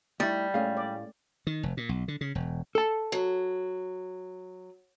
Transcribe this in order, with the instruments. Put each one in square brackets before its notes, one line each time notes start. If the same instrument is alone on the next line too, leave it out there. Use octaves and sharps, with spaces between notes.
[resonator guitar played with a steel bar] G3 [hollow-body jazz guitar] A3 D#4 E4
[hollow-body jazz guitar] A2 G#4 F5 [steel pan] G#3 A3 C#4
[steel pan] D5
[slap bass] D#3
F1
A#2
B1
D3
C#3
E1
[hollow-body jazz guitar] A4 A5
[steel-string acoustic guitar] F#3